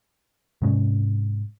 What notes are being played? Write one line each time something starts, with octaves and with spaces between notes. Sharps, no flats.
G#2 C3 G#3 C#4